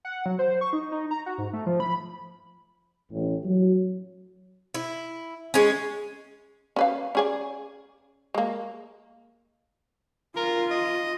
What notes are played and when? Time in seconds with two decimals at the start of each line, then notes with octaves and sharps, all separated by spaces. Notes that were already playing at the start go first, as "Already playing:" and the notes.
0.05 F#5
0.26 F#3
0.39 C5
0.61 C#6
0.73 D#4
0.92 D#4
1.11 A#5
1.26 F#4
1.38 G#2
1.53 A3
1.66 F3
1.80 B5
3.12 A1
3.44 F#3
4.74 E4
5.54 G#3 C#4
6.76 C#4 B4 F5
7.15 C#4 G#4 D5
8.34 G#3 A#3
10.36 F4 A#4
10.70 D#5